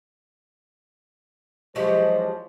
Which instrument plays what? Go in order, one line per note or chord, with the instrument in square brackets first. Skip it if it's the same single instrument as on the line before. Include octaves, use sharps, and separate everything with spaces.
[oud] E2 F3 F#3 [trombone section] G#3 C5 [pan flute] G4 [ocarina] D#5